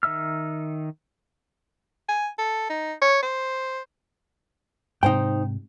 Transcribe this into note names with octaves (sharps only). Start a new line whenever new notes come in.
D#3 D#4 E5 E6 F6
G#5
A4
D#4
C#5
C5
G#2 C3 D#4 C5 G5